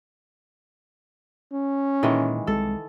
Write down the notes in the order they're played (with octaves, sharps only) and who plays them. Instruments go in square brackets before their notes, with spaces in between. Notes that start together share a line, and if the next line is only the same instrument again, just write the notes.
[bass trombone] C#4
[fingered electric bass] A#2 [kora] D#3 E3 G#3
[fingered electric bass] C2 G#3 [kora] A4